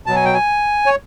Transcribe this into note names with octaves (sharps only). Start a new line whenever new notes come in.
B2 F#3 A5
G#5
G5
G#5
C#5